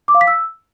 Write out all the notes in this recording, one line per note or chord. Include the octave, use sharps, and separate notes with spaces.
D6
F5
B6
E6